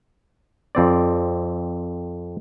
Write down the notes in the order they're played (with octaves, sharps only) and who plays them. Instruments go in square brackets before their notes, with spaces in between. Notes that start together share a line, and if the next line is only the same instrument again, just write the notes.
[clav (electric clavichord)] F2 C4 D5